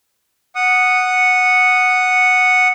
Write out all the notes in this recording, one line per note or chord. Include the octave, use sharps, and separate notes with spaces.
F#5 D#6